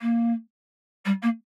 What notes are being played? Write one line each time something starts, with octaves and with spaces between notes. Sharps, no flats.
A#3
G3
A#3